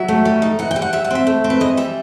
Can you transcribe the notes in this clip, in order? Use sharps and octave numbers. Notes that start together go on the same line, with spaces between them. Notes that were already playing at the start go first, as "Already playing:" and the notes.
Already playing: F#3 E5
A3
G3
D#4
E3 F#5
G5
G3
F#5
G3 E5
F#5
C4 E5
A3
C4
B4
E3 D#5
G3 E5